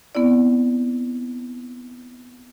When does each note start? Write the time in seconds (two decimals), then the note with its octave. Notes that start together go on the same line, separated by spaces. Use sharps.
0.15 B3 C4 E4 D5